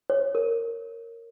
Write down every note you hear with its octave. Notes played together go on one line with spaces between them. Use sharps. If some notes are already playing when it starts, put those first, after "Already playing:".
C#5
A#4